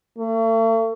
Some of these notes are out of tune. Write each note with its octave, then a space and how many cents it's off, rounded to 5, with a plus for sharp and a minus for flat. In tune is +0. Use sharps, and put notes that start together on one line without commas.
A3 +40